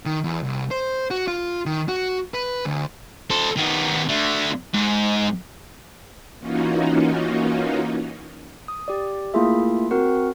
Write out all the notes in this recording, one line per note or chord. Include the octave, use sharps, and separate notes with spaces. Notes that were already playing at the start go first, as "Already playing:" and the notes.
D#3
E2
C2
C5
F#4
F4
D#3
F#4
B4
D2
A4 C5
D#3 B3
D3 A3
G#2
E3 A#3 C#4 D#4 F4 F#4
D#6
G4 D5
A3 A#3 E4 F4 G#4 E5
C4 F#4 A#4 F#5